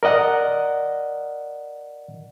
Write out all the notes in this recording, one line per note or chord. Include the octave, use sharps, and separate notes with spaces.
A#4 D5 D#5 F#5